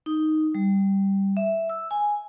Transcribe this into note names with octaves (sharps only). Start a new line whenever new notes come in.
D#4
G3
E5
E6
G#5